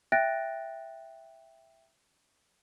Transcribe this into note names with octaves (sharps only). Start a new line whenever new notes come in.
E5 G5 F#6 A6 A#6 D7